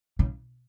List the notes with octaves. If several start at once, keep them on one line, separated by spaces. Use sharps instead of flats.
C#3